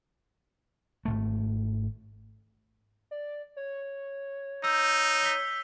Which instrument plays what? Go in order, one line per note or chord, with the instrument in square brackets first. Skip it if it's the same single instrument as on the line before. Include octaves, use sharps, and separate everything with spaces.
[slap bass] G#1 C#2 A3
[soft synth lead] D5
C#5
[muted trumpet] D#4 [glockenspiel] E6 G6
[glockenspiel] B6 G7